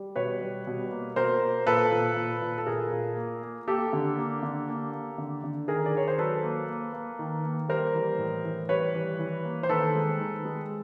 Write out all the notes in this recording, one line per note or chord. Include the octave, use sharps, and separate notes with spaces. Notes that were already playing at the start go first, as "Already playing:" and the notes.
Already playing: G3
B2 B4 C#5
G3
B2
A#3
B2 A#4 C5
A#3
A#2 A4 B4
A#2
A#2
A#2
A4
A#2 G#4 A#4
A#2
A#3
A#3
A#3 G4 A4
D3
A#3
D3
A#3
A#3
D3
D3
D#3 G#4 A#4
D5
D#3 C#5
C5
F#3 A4 B4
A#3
A#3
A#3
D#3
A#3
G3 A#4 C5
E3
A2
E3
G3 B4 C#5
E3
E3
A#3
C5
D#3 A4 B4
G#3
D#3
G#3